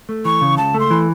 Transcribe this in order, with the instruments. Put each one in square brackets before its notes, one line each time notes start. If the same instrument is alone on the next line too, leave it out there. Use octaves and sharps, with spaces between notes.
[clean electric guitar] A3
[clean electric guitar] E3 [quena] C#6
[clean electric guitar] C#3
[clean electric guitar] C#2 [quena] A5
[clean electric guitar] A3
[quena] C6
[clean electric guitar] E3